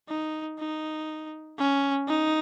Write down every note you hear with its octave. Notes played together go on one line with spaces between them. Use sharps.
D#4
D#4
C#4
D#4